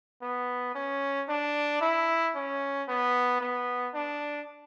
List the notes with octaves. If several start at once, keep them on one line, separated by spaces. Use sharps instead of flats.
B3
C#4
D4
E4
C#4
B3
B3
D4